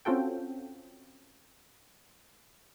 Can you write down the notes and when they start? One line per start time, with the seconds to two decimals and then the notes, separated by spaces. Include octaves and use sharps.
0.05 C4 C#4 F4 F#4 A4 G5